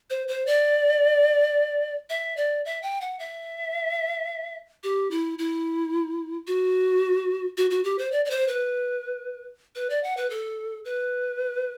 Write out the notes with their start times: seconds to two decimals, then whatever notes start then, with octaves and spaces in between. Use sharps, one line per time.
0.10 C5
0.28 C5
0.47 D5
2.10 E5
2.37 D5
2.65 E5
2.83 G5
3.01 F#5
3.19 E5
4.83 G4
5.11 E4
5.39 E4
6.47 F#4
7.57 F#4
7.70 F#4
7.84 G4
7.99 C5
8.12 D5
8.25 D5
8.30 C5
8.48 B4
9.75 B4
9.90 D5
10.04 F#5
10.17 B4
10.30 A4
10.85 B4